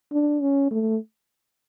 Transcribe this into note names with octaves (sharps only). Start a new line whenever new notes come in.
D4
C#4
A3